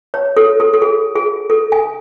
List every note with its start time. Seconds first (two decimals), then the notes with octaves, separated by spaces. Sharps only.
0.14 C#5
0.37 A4
0.60 A4
0.74 A4
0.82 G#4
1.16 G#4
1.50 A4
1.72 G#5